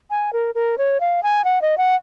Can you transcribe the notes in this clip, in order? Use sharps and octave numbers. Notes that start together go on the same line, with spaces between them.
G#5
A#4
A#4
C#5
F5
G#5
F#5
D#5
F#5